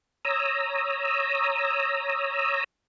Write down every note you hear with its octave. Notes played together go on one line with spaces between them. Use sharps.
C#5 A#5 D#6 E6